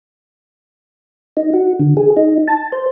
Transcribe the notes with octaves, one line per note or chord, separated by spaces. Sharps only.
D#4
F#4
D3
G#4
D#4
A5
C5